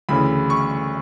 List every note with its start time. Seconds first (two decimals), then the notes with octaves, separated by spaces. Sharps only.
0.09 D2 C#3 E3 B5
0.50 C#6